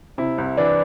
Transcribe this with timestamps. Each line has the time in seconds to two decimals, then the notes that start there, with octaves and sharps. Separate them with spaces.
0.18 C3 E4
0.38 C2
0.57 E3 D4